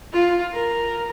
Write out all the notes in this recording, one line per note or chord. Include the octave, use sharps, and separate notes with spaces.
F4
A#4